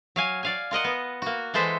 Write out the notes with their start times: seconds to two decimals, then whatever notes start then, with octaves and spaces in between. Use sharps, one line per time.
0.16 F#3 F5 G#5
0.43 D5 F5 G#5
0.71 F4 A#4 D#5 F#5
0.84 B3
1.22 A#3 F#4
1.54 E3 G#3 A4 C5 E5